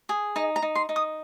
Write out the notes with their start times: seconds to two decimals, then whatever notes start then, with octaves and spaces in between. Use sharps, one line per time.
0.09 G#4
0.36 D#4 D#5
0.56 A#5
0.62 D#4
0.75 C6
0.89 D#4
0.96 D#6